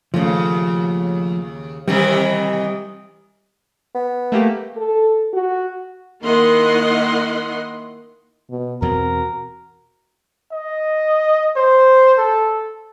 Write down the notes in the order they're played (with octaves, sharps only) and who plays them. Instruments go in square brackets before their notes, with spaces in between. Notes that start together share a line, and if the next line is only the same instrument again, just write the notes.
[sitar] D#2 C#3 [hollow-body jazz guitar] F3 A3
[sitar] C3 D#3 E3 [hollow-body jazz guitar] G3
[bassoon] B3
[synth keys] A3 A#3 G4
[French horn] A4
F#4
[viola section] D#3 A#3 E4 D#5 F#5 C6
[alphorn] B2
[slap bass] E2 B2 C4 [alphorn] F#4 [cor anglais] A#4
[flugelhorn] D#5
C5
A4